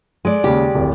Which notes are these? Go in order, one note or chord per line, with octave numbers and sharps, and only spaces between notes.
G#3 D5
D#2 C#3 G4
D1 G#1